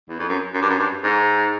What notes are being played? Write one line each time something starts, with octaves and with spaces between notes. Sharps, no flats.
E2
F2
F#2
F#2
G2
F#2
G2
G#2